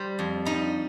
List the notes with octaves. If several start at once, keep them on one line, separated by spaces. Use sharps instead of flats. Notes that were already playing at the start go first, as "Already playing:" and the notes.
Already playing: G3 C5
F2
G3 D#4